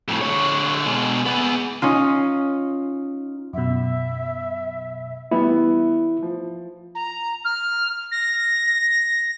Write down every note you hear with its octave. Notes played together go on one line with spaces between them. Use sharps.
F2 A2
D3 C#5
B2 G#3
B3 G#4
C#4 D#4 F4
F#2 B2 E5
E3 G3 B3 E4
F3
A#5
F6
A#6